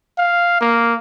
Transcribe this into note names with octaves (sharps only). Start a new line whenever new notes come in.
F5
A#3